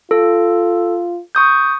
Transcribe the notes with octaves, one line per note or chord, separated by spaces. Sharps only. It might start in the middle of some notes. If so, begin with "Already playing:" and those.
F4 A4
C#6 D#6 G6